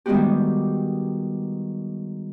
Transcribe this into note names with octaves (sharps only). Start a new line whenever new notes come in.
D#3 G3 G#3 B3 F#4 G4